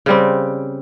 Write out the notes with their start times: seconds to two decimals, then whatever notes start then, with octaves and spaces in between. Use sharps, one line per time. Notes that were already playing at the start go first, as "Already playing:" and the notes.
0.06 C#3 G3 C4